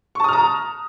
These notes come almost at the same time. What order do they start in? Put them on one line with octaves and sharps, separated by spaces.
C#6 A5 D#6 F6 A#5